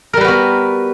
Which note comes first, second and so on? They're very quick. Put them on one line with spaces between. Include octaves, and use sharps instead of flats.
A#4 G3 B4 F#4 B3